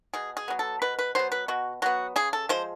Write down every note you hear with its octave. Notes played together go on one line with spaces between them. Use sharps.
B2 G#4
G#4
F#3 B3
A4
B2 B4
B4
F#3 B3 C5
B4
B2 F#4
F#3 B3 F#4
C#3 G#4
A4
F3 G#3 C5